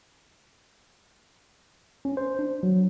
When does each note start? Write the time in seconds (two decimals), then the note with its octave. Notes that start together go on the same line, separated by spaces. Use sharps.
2.05 C#4
2.17 C5
2.39 D4
2.63 F#3